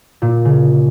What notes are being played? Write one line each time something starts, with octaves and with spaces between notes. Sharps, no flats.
A#2
C#3